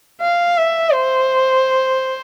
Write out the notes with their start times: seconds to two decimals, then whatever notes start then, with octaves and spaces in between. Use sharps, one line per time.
0.21 F5
0.57 E5
0.93 C5